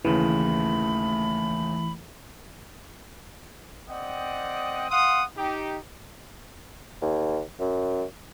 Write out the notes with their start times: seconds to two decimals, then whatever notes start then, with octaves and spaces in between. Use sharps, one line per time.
0.05 D#2 C#3 E3 A3 B5
3.89 C4 D5 D#5 F#5 G5 D#6
4.90 F5 F#5 C6 D#6
5.37 D#4 G4
7.02 D#2
7.60 F#2